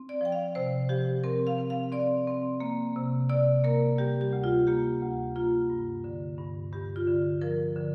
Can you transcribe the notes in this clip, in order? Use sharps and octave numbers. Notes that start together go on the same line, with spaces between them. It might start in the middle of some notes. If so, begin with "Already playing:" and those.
Already playing: C4
D5
F3 G5
F5
C3 C5
F3 G4
C4 A#4
F5
C4
F5
C4 D5
C4
A#3
C3
C3 D5
A#3 A#4
G3 G4
G4
D2
F4
A#3 G4
D2
A#3 F4
G2
D3
G2
G2 G4
F4
D3
F3 A#4
D3